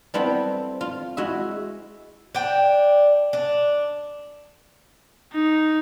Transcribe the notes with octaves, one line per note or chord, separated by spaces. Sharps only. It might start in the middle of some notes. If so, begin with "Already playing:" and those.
G3 B3 C4 E4 A4 C5
F4
G#3 E4 F#4 E5
D4 G5
D4
D#4